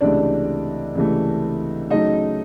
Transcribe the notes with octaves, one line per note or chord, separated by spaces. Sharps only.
C#2 C3 E3 A3 D4 D5
C#2 C3 E3 A3
C#3 F#3 A3 D#4 D#5